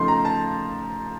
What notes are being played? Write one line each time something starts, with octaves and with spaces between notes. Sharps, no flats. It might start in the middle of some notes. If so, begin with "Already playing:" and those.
Already playing: C#3 F3 A3 D#4 C6
A#5
A5